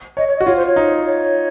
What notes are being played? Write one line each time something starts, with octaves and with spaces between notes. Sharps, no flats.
C#5 D#5
C#5
F#4 D#5
F4 C#5
C5
C#5
D#4
C#5